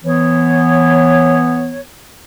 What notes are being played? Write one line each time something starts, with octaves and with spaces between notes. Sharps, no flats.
E3 B3 C#5